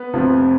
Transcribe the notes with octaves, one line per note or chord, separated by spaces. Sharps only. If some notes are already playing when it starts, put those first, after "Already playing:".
Already playing: B3 B4
F1 F2 F3